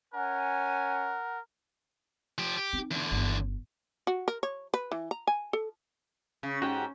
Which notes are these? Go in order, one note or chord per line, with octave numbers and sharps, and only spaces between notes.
C#4 A#4 F#5 G#5
F3 G4
G4
C4 D#4
E2 D3
G1
F#4
A#4
C#5
B4
E3
A#5
G#5
A4
C#3
G#2 F#4 G4 G5